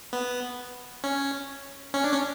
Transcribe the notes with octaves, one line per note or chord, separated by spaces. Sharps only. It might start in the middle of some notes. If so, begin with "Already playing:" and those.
B3
C#4
C#4
D4
C#4